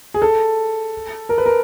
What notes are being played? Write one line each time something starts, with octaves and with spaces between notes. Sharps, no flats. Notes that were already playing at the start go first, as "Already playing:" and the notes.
G#4
A4
A#4
B4
A#4